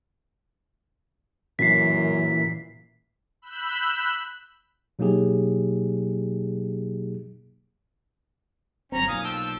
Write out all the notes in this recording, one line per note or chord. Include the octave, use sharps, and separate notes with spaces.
F#2 A#2 E3 B6 C7
B5 E6 F#6 G6
B2 F#3 A#3 D#4 G4 G#4
G1 F#2 C4 C#4 A#5
B1 A#2 F5 G#5 D#6
F3 G5 A5 E6